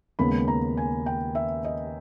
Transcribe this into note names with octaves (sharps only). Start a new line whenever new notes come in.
D#2 C#3 G#3 B3 B5
A#5
G#5
G5
E5
D#5